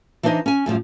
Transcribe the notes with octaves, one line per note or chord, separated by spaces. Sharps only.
E3 D4 D#4 C5 D#5
C#4 G#5
F#2 A2 F3 G3